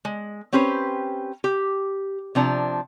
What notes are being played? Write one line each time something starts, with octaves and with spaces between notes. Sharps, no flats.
G#3
C4 C#4 G4 B4 C5
G4
C3 F3 D4 A#5